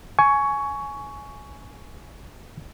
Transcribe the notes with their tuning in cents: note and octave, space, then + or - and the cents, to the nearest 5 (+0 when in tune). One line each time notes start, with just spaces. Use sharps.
G#5 +15 C#6 +15